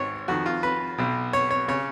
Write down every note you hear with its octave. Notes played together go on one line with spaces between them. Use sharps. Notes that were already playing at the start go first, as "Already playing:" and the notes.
Already playing: G#1 G#2 C#5
F2 D#3 F#4
F4
B4
B1 B2
C#5
C#5
C#3 C#5